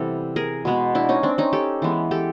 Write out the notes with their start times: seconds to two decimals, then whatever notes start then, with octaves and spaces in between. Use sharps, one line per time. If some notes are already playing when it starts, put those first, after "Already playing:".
Already playing: C3 E3 G3 B3 G4 A4
0.36 G#4 A#4
0.65 B2 G#3 B3
0.95 D4 E4
1.09 C#4 D#4
1.23 C4 D4
1.38 C#4 D#4
1.53 G4 A4
1.82 E3 G#3 B3
2.11 G4 A4